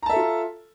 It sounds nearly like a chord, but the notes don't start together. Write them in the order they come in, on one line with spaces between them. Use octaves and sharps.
A#5 A5 E5 A4 F4